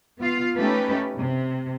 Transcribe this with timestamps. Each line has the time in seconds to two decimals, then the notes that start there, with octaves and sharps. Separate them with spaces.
0.20 B3 F4 F5
0.57 A3 C#4 D#4 G4 A4 B4
1.15 C3